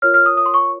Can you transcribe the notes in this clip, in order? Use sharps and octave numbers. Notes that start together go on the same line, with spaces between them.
F4 A#4 C#5 F6
F6
D#6
D#6
C6
C#6